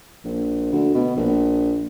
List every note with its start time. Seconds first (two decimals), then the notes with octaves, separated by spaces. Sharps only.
0.25 A#1
0.72 D2
0.95 B2
1.16 A#1